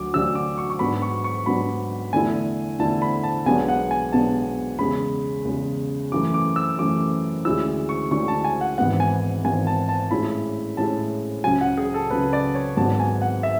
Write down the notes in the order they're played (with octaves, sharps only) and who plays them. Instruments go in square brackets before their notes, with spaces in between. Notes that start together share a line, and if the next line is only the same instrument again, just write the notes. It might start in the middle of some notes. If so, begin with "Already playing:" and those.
Already playing: [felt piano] D2 D3 F#3 [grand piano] D6
[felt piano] D2 D3 F#3 [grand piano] E6
[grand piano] D6
C#6
C#6
[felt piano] G#2 F#3 B3 D4 [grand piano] B5
[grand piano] C#6
C#6
[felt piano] G#2 F#3 B3 D4 [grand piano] B5
[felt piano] E2 D3 A3 E4 [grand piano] G#5
[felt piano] E2 D3 A3 E4 [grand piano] A5
[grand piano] B5
A5
[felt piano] B1 B2 G#3 B3 D4 [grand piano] G#5
[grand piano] F#5
G#5
[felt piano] B1 B2 G#3 B3 D4 [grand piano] A5
[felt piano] E2 C#3 G#3 [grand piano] B5
[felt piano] E2 C#3 G#3
[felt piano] F#2 E3 A3 [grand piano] D6
[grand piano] D6
E6
[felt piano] F#2 E3 A3 [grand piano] D6
[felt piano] D2 D3 G#3 C#4 E4 [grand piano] E6
[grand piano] C#6
[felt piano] D2 D3 G#3 C#4 E4 [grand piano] C#6
[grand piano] A5
G#5
F#5
[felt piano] G#1 G#2 E3 B3 [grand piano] F#5
[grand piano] G#5
[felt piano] G#1 G#2 E3 B3 [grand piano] G#5
[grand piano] A5
A5
[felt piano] A2 G#3 C#4 E4 [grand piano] B5
[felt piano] A2 G#3 C#4 E4 [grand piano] A5
[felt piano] C#2 C#3 F#3 [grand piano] G#5
[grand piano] F#5
G#4
A4
[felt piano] C#2 C#3 F#3 [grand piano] B4
[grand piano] D5
C#5
[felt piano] G#1 G#2 F#3 B3 [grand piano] A5
[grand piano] G#5
F#5
E5